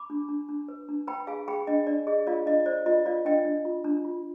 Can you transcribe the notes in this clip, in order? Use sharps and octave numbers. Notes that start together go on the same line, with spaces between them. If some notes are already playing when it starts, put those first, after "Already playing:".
Already playing: B5 D6
D4
D4
D4
B4
D4
B4 G5 B5
G#4 F5 G#5
G#4 G5 B5
D4 D#5 G5
D4 D5
G#4 D#5
F4 D5 F5
D4 D#5
C5 D5
F4 D#5
F4 D5 F5
D4 D#5 G5
D4
F4
D4
F4